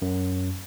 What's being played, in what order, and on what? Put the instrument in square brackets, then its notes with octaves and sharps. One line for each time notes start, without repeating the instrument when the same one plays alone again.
[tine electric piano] F#2